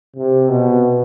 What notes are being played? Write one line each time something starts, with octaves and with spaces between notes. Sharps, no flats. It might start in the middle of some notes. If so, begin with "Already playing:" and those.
C3
B2